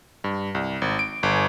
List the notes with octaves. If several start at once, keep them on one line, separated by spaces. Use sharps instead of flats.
G2
C2
G#1
D7
G1